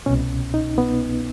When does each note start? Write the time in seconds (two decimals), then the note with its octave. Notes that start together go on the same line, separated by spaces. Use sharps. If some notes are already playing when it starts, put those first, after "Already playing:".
0.06 C2 B2 C#4
0.54 D#4
0.78 B3